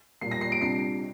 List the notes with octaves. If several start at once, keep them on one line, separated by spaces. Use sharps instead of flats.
A#2 G3 A#3 C7
A#6
C7
D7
C3 G3 D4 F4 C7